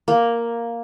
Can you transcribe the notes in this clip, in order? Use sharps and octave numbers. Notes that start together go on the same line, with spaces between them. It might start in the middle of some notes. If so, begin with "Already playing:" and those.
A#3